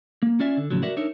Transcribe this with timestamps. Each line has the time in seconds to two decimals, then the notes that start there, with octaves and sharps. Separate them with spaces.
0.23 A#3
0.40 C#4 F4 D5 E5 G#5
0.57 D3
0.71 A2 C#3 F3 F#3
0.83 F#4 A#4 D5 E5 F#5
0.97 D4 D#4 A#4 C#5 E5